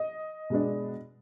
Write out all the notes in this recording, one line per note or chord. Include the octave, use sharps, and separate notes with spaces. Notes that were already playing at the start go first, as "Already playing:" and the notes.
Already playing: D#5
B2 G#3 B3 D4